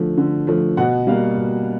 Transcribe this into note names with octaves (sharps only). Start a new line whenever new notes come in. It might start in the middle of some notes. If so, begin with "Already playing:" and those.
Already playing: D3 F3 A3
D3
F3 A3
B2 F#5
G3 A#3 F5
B2